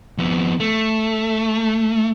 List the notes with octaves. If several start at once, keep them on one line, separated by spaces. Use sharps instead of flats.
F2 B3
A3